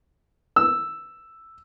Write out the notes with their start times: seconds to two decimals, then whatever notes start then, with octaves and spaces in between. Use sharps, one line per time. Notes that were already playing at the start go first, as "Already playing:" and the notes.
0.56 E6